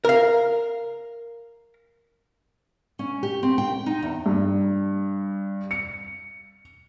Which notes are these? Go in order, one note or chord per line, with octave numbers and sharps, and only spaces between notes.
A#4 F5
C#4
G4
C4
G5
D#4
E2
G2
C#7